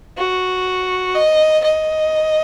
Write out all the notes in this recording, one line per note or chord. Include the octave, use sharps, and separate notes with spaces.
F#4
D#5
D#5